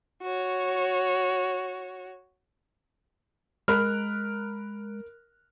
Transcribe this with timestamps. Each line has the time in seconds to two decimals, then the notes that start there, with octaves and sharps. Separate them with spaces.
0.22 F#4 C#5
3.68 G#3 A#4 B5 F6 F#6